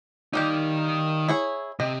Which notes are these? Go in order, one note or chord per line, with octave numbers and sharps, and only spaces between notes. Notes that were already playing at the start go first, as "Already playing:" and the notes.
D#3 G3 A#3 D#4 G4
E4 G#4 C#5
C3 D#5